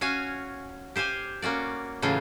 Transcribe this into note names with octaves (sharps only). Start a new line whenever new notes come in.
C#4 F#4 F5 G#5
G4 C5 F5 G#5
A#3 C#4 F#4 D5
A2 C#3 E3 F#3 A3 F4